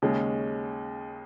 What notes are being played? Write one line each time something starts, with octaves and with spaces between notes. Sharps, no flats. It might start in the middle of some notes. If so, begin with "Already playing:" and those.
D#2 C#3 G#3 C#4